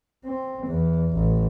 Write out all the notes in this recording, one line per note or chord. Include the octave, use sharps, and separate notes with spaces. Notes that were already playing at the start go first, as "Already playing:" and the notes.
C4
E2
A1